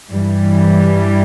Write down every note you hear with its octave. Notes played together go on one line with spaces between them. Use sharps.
G2 E3 G3